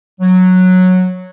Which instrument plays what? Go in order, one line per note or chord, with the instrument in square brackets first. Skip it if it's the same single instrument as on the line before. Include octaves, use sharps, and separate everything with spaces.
[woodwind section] F#3